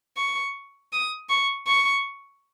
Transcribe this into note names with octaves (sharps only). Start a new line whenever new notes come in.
C#6
D#6
C#6
C#6